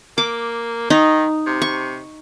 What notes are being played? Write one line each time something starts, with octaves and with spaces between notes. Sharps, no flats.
A#3 D6
D#3 D#4
C3
C#6